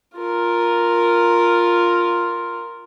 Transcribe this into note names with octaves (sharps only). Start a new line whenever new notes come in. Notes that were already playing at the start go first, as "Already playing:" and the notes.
F4 A#4